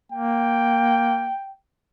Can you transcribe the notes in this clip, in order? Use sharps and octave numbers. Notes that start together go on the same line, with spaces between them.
A#3 G5